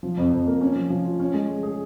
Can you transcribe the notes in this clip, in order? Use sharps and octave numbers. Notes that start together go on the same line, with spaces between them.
F3
F2
F2
A#3
C#4
F3
F3
F4
C#4
G#3
G#3
G#4